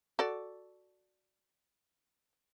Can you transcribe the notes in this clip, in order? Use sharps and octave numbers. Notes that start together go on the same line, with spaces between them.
F#4 A4 D5